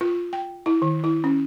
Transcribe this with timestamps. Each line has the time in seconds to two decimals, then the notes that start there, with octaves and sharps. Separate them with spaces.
0.01 F4
0.33 G5
0.66 E4
0.82 D#3
1.04 E4
1.24 C#4